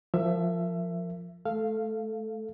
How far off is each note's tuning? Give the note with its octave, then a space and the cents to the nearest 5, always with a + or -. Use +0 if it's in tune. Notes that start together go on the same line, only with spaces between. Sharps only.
F3 +0 A#4 -20 E5 +20
A3 -30 A4 +0 F5 -10